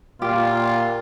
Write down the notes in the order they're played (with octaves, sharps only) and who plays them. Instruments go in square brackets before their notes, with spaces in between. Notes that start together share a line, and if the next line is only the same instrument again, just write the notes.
[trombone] A#2 [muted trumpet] F4 [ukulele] G4